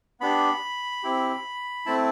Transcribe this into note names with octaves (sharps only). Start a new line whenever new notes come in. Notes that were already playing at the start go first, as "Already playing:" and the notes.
B3 D4 G4 B5
C4 E4 G4
A3 C4 E4 A5